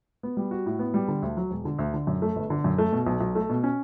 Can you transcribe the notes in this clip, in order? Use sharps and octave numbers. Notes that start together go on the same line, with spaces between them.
B3
G3
F#4
A2
B3
G3
D3
D2
F#3
E1
D3
D2
D3
F#2
A3
G1
D3
F#2
A3
B2
B1
B1
A3
B2
C#4